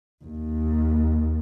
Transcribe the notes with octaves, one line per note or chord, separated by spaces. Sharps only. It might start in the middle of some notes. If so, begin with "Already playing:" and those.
D#2